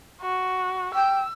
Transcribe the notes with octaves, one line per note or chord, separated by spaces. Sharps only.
F#4
G5 E6